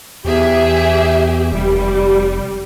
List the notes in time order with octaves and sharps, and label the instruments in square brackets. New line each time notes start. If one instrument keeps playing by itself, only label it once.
[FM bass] E2 [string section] G4 G#4 E5
[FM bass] F1 [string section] G3